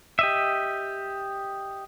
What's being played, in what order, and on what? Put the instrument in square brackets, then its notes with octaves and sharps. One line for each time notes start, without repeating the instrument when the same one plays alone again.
[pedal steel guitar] G4 D#5 E5